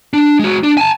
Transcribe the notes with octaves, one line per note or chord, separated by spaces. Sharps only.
D4
G#3 F#4
D4
G#5 A5